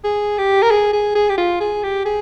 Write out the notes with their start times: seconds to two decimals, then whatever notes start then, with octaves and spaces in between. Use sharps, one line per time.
0.04 G#4
0.38 G4
0.62 A#4
0.71 G#4
0.93 G#4
1.15 G#4
1.29 G4
1.38 F4
1.60 G#4
1.83 G4
2.05 G#4